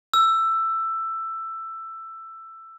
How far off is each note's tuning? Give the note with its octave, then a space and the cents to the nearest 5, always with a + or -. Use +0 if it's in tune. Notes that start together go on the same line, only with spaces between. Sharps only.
E6 +10